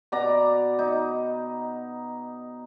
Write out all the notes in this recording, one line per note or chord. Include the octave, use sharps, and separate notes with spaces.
B2 D5 A#5
D#4